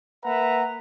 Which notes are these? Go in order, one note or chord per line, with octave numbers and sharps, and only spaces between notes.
A#3 B4 E5 F#5 A#5